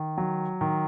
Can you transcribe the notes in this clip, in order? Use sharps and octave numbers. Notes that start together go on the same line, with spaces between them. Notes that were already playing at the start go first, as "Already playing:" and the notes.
Already playing: D#3
F#3
D#3